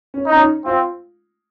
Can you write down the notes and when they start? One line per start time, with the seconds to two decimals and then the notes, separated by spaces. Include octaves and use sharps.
0.14 C#4
0.26 D#4
0.33 C#4
0.39 D#4
0.65 C4 F4